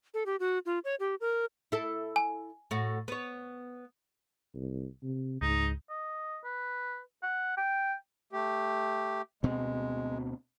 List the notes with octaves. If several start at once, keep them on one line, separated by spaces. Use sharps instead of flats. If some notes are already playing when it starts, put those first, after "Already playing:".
A4
G4
F#4
F4
C#5
G4
A#4
E4 A4
G#5
A2 F#4
B3 C#5
C2
C3
C#2 G#2 D#4
D#5
B4
F#5
G5
A3 G4
D2 B2 G#3 C4